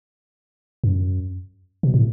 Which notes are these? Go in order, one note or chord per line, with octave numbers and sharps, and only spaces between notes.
F#2
B2
A2